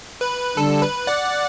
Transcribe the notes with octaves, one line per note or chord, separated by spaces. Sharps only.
B4
D3 G3 D4 A4
B4
D5 F#5